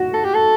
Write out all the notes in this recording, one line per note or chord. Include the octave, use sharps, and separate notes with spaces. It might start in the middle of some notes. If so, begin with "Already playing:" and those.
Already playing: F#4
A4
G4
A4